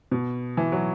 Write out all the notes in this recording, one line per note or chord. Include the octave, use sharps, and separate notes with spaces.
B2
E3
F#3